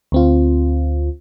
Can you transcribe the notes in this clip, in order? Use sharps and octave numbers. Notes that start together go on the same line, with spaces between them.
D2 C4 F4